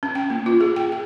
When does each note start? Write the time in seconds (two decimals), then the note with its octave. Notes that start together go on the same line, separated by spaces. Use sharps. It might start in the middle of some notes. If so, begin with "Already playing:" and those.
0.03 C#4
0.15 G5
0.30 A#3
0.46 F4
0.61 G#4
0.76 G5
0.92 G#4